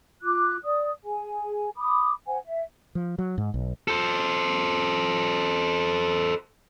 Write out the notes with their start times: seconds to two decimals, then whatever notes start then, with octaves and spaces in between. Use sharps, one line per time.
0.22 F4 D6 F#6
0.64 D5 D#6
1.03 G#4 G#5
1.76 B5 D6 D#6
2.27 C5 F#5 G#5
2.44 E5
2.95 F3
3.19 F#3
3.38 G#2
3.54 B1
3.88 A4 C5